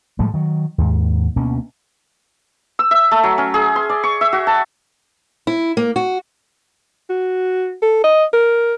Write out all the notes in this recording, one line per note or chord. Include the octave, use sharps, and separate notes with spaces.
A2 F3 G3 G#3
D#3 F#3
D#2 G#2
D2 B2 A#3 C#4
E6
E5
A3
F#3
C#4
G#4
C6
D5
C#6
E5
F#4
A5
E4
A#3
F#4
F#4
A4
D#5
A#4